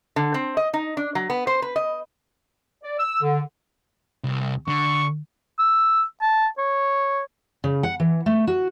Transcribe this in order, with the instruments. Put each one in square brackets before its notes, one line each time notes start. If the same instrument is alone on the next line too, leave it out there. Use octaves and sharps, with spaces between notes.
[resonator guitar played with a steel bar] D3
C4
D#5
D#4
D4
F#3
B3
C5
B4
D#5
[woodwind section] D5
E6
D3
[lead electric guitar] C2
[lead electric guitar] D3 [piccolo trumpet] C#6
[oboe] E6
A5
C#5
[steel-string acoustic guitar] C#3
F#5
E3
A3
F#4